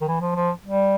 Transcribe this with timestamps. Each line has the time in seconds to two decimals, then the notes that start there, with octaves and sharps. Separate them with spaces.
0.01 D#3
0.08 E3
0.21 F3
0.36 F3
0.64 G3